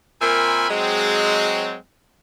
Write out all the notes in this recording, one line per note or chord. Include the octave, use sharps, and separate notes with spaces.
A#2 C4 A#4 E5 G#5 B5
F#3 G#3 C4